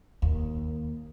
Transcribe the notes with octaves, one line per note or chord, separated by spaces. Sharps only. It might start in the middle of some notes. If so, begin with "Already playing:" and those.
D#2